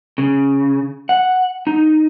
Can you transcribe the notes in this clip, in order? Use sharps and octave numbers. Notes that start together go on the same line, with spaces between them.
C#3
F#5
D#4